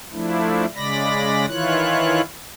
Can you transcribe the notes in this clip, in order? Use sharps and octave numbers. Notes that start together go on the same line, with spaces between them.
F3 A3 D4 E4
C#3 G#3 D5 B5 A#6
D#3 E3 E4 F4 C#5 F#6